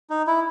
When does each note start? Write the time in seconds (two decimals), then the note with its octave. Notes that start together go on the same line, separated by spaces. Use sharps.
0.10 D#4
0.27 E4